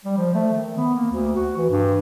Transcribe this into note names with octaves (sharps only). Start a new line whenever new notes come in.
G3
F3
A3
D#3
B3
A#3
D2
F#4
E3
G2